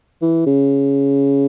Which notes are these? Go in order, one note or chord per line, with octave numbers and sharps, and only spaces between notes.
E3
C#3